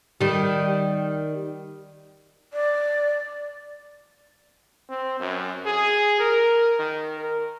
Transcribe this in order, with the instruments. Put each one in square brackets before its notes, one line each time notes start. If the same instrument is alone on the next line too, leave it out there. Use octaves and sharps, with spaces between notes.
[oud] D#3 G3
[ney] D5
[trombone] C4
F#2
G#4
A#4
D#3
A#4